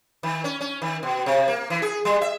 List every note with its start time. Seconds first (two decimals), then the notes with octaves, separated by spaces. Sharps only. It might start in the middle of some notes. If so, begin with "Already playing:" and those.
0.23 D#3
0.44 C#4
0.61 C#4
0.82 D#3
1.03 B2
1.26 C3
1.48 A#3
1.70 E3
1.82 G#4
2.05 G3
2.21 E5